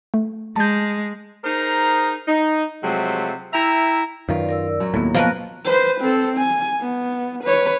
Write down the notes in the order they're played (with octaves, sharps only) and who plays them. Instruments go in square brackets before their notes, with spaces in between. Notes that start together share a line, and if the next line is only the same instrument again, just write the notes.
[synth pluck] A3
[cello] G#3 [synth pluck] A5 G6
[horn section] D#4 G#4 A#4 C5 A#5
D#4
C3 F3 F#3 G#3 A3
E4 E5 G5 A#5
[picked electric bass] F#2 D#3 [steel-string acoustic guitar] F4 [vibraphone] B4 D5
[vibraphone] A#4 D5 E6
[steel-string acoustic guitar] F#2 F#3
[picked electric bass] D#2 A2 [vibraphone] A#3 B3
[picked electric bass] B2 [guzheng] F3 A#4 B4
[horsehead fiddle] B4 C5
C4 A4
G#5
B3
B4 C#5